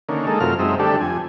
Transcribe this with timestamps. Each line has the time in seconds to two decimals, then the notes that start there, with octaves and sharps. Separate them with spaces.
0.09 D3 D#3 A#3 C#4
0.27 G#3 A#3 D#4 A4
0.40 F#2 C3 A3 F4 A#4 F6
0.59 F#2 G#3 C4 D#4 E5
0.79 D3 G3 A3 D4 G4 A4
1.00 F2 G#5